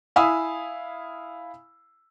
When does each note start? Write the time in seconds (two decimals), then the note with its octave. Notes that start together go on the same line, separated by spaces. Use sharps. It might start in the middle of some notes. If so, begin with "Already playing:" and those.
0.16 E4 F5 G#5 B5 D#6 E6